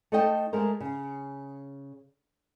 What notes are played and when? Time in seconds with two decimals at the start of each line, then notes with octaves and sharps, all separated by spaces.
0.12 A3 D#4 A4 C5 D#5 G5
0.53 G#3 A3 A#4 C5
0.80 C#3